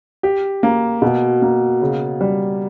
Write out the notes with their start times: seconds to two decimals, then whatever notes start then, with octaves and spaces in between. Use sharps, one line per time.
0.23 G4
0.63 A#3
1.02 B2
1.42 A#3
1.81 C#3
2.21 G3